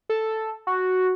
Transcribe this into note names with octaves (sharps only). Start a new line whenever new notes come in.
A4
F#4